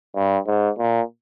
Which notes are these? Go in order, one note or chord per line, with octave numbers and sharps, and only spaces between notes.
G2
G#2
A#2